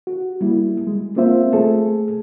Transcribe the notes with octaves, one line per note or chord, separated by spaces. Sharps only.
F#4
G3 A#3 E4
G#3
A#3 C4 F4 C5 E5
A3 G#4 A4